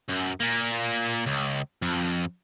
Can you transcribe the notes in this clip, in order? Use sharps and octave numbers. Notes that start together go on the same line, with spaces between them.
F#2
A#2 A#3
C#2
F2